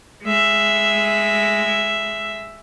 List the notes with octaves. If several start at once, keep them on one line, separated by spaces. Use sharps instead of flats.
G#3 E5